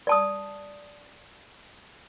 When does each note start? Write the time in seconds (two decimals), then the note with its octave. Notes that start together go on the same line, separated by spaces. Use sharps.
0.07 D5 A5 D#6